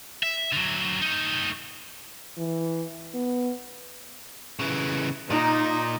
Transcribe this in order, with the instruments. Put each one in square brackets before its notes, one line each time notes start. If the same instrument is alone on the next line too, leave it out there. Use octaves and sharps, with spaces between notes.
[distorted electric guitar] E5
D3 F#3
A3 D#4
[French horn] E3
B3
[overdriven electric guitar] C#3 E3
[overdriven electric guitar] A#2 [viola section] D#4